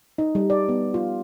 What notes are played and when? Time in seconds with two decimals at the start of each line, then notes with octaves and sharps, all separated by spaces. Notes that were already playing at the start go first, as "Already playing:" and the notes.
0.18 D#4
0.35 G3
0.50 D5
0.69 B3
0.94 F4